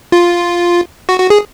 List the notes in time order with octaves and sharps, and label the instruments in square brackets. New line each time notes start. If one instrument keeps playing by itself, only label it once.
[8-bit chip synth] F4
F#4
F#4
G#4